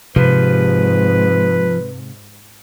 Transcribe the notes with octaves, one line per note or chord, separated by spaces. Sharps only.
G#2 C3 F3 B4